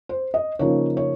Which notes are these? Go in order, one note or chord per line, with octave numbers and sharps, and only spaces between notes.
C5
D#5
C#3 F3 A#3 D#4 C#5
C#5